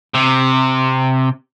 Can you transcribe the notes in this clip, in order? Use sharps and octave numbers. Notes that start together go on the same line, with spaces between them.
C3